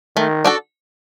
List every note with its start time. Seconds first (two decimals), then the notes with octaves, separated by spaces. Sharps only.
0.16 D#3 A3
0.44 D4 F#4 A4